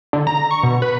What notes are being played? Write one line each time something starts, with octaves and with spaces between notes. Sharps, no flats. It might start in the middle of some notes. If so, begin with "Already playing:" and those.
D3
A#5
C#6
B2
B4